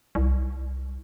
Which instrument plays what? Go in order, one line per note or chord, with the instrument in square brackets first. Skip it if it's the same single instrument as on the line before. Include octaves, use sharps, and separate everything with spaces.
[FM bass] C2